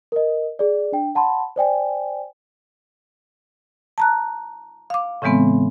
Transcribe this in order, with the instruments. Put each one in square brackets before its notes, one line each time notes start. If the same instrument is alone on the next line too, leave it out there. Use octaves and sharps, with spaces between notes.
[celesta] A#4 D#5
G#4 D5
D4 G5
F#5 A5 B5 C6
C5 D5 G5 G#5
[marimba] A5 A#5 F#6
F5 D6
A2 C#3 E3 G#3 B3 C4